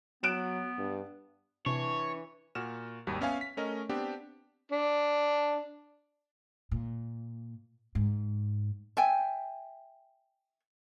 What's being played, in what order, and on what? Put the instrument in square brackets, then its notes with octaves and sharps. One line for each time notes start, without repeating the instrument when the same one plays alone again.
[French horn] F#3 [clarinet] B3 [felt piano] F#6 D7 E7
[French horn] G2
[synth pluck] C3 [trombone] E3 [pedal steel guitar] D4 C#6 [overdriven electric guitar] C#5
[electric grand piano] A#2 F#4 F6 E7
G#1 D#2 G3 F#4
B3 C#4 E5 F5 G#5
B6
A3 C#4 A#4 D#5
B3 C4 D4 G4
[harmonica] D4
[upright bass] A#2
G#2
[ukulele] E5 G5 G#5